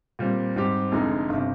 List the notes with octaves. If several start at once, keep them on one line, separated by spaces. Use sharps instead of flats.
A#2 G3 C4
G#2 G3 C4 G4
F1 F2 D3 G#3 D#4
G1 C3